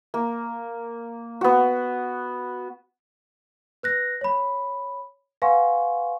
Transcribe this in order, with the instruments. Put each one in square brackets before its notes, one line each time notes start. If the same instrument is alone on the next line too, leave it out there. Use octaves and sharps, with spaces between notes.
[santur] A#3
B3 F#4
[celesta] B4 F#6 A#6
C#5 B5
B4 F5 F#5 G#5 C6 C#6